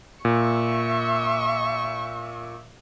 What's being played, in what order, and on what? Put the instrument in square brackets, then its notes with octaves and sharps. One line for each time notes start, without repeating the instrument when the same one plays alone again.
[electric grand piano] A#2 [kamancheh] E5 C#6